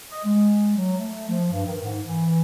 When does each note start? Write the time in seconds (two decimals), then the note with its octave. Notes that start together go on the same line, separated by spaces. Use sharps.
0.11 D#5
0.25 G#3
0.76 F#3
0.97 A3
1.28 F3
1.51 G2
1.65 D#3
1.82 G#2
2.06 E3